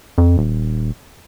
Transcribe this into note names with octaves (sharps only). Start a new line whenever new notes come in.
F2
D#1